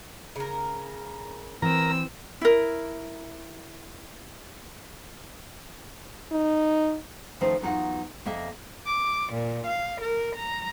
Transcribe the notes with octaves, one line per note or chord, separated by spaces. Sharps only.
C#3 A#4
E3 C4 A#4 A#5 E6
E4 A#4
D#4
D#3 F3 A3 C#4 D#4 C5
E2 F#3 D#4 F4 F#5
F2 A#3 D#5 E5
D6
A#2
F5
A#4
A#5